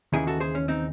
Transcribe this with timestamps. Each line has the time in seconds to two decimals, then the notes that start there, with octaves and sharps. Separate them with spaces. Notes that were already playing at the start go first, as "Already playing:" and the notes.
0.13 D#2 C#3 E3 E4 G#4
0.27 F#4 A4
0.40 G#4 C5
0.55 C#4
0.68 C4 D#4